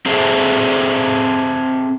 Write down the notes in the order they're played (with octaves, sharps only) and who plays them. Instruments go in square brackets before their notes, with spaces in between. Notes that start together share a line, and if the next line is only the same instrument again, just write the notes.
[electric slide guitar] C4 G#4 A4 C5 E5